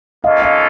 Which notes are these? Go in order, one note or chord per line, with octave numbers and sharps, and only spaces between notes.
A#3 C#4 F4 A4 D#5 F5
D#5 F5